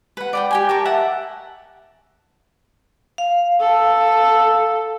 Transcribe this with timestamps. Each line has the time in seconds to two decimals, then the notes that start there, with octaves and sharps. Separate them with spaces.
0.17 B4 F#5
0.33 D5 F#5 G5
0.51 G4 G5 G#5
0.69 G4 A#4 A5 C#6
0.85 E5 F#5 A5
3.18 F5
3.60 A4